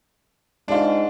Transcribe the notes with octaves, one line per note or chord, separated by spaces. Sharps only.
G#2 D4 F4